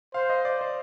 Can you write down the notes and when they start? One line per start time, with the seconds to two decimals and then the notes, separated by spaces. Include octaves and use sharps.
0.14 C5 F5
0.30 D#5
0.45 D5
0.61 C5